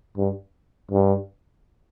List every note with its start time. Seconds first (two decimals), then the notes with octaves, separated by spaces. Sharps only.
0.18 G2
0.91 G2